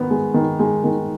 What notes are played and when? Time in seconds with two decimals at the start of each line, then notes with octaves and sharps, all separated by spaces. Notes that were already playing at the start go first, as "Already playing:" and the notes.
Already playing: D#3 B3
0.10 G#3
0.34 D#3
0.59 G#3
0.84 D#3